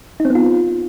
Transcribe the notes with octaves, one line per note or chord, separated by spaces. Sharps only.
D#4
C4
B3
F4